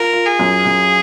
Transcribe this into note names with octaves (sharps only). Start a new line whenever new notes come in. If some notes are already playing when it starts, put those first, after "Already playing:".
Already playing: F4 A#4
F4
G#4
F#2
F#2